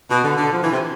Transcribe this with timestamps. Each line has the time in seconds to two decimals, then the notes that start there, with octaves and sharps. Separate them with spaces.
0.10 B2
0.24 D3
0.38 D3
0.52 F3
0.62 E3
0.73 C3